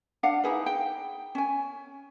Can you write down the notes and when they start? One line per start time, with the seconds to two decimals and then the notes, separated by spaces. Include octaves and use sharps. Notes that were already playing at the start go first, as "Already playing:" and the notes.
0.23 D4 F5 F#5
0.44 D#4 E4 G#4 B4
0.66 G5
1.35 C#4 G#5